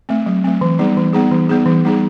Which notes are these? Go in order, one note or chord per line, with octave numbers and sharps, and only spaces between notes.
A3 C4
F#3
A3 C4
E3
G3 B3 D#4 G#4
E3
G3 B3 D#4 G#4
E3
G3 B3 D#4 G#4
E3
G3 B3 D#4 G#4